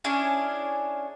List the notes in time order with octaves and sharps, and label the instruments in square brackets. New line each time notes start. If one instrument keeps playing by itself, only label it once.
[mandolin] C#4 D4 E4 G#4